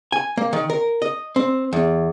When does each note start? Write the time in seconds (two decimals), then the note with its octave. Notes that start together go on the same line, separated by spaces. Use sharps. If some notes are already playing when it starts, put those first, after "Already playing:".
0.12 G#5
0.37 A#3
0.53 D#3
0.70 A#4
1.02 D#5
1.36 C4
1.73 E2